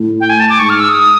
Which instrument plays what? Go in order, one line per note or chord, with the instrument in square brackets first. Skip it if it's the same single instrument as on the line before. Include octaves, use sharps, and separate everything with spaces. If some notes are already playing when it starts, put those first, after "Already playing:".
Already playing: [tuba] A2
[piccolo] G5
G#5
A5
D6
[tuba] G#2 [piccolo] C#6
[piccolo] F6
E6
D#6